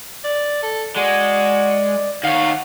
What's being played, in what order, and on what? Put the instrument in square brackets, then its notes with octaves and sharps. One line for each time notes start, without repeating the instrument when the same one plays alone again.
[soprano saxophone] D5
A4
[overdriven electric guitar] G#3 [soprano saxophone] F#4 [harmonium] D5
[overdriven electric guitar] D#3 C#5 [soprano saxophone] F5 [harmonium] F#5